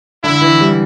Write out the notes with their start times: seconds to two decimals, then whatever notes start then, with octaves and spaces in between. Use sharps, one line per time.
0.24 D3 E4
0.42 E3
0.61 G3